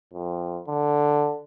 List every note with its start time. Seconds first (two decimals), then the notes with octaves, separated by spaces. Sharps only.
0.13 F2
0.68 D3